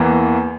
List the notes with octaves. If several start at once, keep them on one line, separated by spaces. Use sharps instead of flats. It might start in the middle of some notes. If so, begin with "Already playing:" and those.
Already playing: E2 E3 A#3